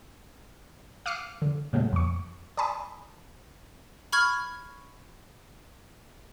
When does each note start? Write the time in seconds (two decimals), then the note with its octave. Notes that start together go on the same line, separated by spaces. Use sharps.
1.06 F5 D6 D#6 F6 C7 C#7
1.42 D3
1.73 A#2 C#3 F#3 G3 A3
1.93 F2 C#6
2.57 D5 G#5 A5 B5 D#6
4.12 B5 C#6 F6 G#6